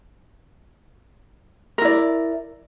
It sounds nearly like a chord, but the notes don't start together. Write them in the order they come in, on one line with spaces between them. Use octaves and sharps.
A#4 E4 D5